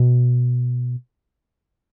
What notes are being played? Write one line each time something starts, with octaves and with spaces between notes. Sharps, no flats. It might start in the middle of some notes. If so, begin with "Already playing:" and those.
Already playing: B2